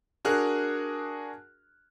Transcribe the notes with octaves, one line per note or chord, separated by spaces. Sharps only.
D4 F#4 G#4 A#4 F6 F#6